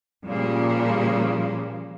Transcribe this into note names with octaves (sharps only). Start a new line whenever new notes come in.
A#2 C#3 F3 G3 A#3